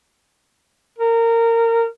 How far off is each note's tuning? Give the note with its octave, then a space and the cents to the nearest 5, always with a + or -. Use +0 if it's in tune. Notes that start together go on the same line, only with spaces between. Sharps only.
A#4 -20